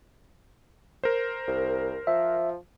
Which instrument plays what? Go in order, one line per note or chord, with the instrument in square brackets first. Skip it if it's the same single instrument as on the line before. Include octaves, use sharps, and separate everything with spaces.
[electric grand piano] A#4 C5
[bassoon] C2
[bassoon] F3 [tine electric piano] E5